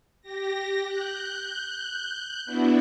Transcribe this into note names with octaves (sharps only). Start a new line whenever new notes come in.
G4 A#6
F#6 G6
B3 D4 E4 F#4